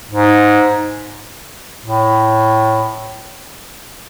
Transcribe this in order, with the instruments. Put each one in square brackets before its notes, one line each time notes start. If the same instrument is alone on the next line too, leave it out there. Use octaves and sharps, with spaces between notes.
[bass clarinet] G#2
A2